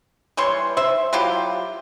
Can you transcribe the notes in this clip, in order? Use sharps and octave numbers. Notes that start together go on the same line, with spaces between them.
E3 G3 C#5 C6
C5 E5
F#3 E4 F4 G4